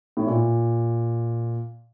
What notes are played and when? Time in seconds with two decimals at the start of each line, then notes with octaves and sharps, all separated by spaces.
0.17 A2
0.27 A#2